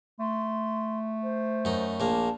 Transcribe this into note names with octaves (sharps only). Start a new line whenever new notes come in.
A3 C6
C5
F#2 D#4
A#1 A#3 A5